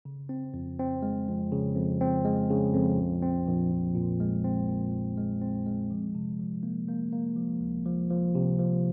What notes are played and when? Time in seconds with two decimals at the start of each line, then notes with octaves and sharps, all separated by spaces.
0.05 C#3
0.29 C4
0.54 F2
0.79 C4
1.03 G#3
1.28 F2
1.52 C#3
1.76 F2
2.01 C4
2.25 G#3
2.50 C#3
2.74 F2
2.98 A#1
3.23 C4
3.47 A#1
3.72 A#1
3.95 A#2
4.20 G#3
4.44 C4
4.68 A#2
4.92 A#1
5.18 G#3
5.41 C4
5.66 G#3
5.90 F3
6.15 C3
6.39 F3
6.63 A#3
6.88 A#3
7.12 A#3
7.36 F3
7.61 C#2
7.86 F3
8.10 F3
8.35 C3
8.59 F3